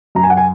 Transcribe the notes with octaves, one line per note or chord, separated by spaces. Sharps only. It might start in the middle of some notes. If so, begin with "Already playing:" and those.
F#2 A#5
G#5
F#5
G#5